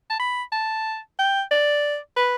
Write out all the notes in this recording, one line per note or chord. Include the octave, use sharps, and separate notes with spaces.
A5
B5
A5
G5
D5
B4